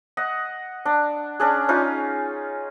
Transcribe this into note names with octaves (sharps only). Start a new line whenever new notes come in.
D#5 F#5
D4
C#4 D4 G#4
C#4 D#4 F4